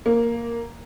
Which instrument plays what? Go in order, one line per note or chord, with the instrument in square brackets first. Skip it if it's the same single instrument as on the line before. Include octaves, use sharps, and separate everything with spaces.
[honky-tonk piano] A#3